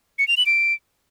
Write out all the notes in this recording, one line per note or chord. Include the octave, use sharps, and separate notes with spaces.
C#7
F7
F#7
D7